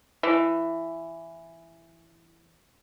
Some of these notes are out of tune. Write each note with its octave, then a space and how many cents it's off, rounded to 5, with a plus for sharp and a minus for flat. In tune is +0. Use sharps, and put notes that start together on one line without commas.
E3 +10